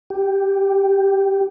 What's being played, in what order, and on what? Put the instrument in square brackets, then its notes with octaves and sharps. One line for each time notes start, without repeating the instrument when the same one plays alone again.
[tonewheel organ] G4